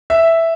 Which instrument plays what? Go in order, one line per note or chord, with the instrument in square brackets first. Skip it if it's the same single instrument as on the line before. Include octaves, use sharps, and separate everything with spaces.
[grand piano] E5